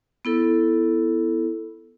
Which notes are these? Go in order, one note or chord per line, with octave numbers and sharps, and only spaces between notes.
B3 E4 A4